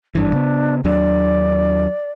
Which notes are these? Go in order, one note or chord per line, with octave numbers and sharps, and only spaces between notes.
G#1 G2 E3 D4
C#3 B3
D#2 F#3 D4 D5